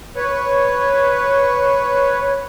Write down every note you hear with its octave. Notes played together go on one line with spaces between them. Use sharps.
B4 C#5